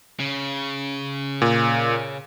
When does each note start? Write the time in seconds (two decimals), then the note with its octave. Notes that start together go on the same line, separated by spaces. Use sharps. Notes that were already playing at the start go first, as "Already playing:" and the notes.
0.20 C#3
1.42 A#2